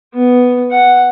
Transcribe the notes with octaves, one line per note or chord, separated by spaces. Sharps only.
B3
F#5